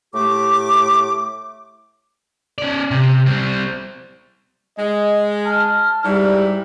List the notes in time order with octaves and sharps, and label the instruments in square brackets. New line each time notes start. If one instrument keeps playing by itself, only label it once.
[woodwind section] A2 A3 G4 D6
[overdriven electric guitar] C#4 D5
C3
G3 C4
[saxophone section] G#3 [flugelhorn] D#5
[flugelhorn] A5 [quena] F6
[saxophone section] G#2 E4 [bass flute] G3 [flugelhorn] D5